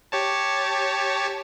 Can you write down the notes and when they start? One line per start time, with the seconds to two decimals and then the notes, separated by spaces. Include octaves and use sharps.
0.12 G4 C#5 A5